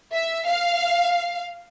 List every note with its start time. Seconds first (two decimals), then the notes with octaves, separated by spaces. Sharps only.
0.13 E5
0.48 F5